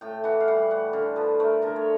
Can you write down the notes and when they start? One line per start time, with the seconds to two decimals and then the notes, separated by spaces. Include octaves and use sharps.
0.01 A2 G5
0.24 E3 F#5
0.40 F5
0.48 G3 F#5
0.71 A2 F#5
0.93 D3 F5
1.16 F3 B4
1.40 A3 A#4
1.62 D3 A#4
1.76 C#5